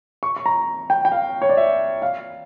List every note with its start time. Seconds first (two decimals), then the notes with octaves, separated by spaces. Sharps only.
0.23 C#6
0.36 C#6
0.46 A#5
0.90 G5
1.05 G5
1.12 F5
1.42 C#5
1.49 D5
1.57 E5
2.02 F5